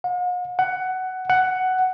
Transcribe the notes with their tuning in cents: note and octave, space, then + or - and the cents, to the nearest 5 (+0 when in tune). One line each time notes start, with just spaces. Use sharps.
F#5 -45
F#5 +15
F#5 +10